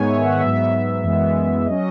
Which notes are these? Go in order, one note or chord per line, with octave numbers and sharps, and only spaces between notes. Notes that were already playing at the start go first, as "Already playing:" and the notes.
Already playing: G#2 D#3 G#3 B3 C#5 G#5
E5
F#5
G#2 F#3 B3 E5
F#2 E3 G#3 B3
F#3 C#4 D#5